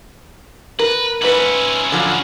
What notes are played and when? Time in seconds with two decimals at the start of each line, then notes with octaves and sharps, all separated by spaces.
0.79 A#4 B4
1.22 G#2 C#4 E4 B4
1.92 D3 F3 F#3